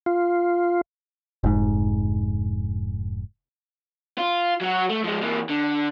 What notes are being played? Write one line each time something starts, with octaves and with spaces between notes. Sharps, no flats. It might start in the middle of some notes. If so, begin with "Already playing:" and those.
F4
F1 G#2
F4
F#3 F#4
A3
F3 G#3
E3 A#3
D3